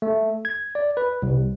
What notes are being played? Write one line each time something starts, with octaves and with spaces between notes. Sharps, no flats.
A3
G#6
D5
B4
C2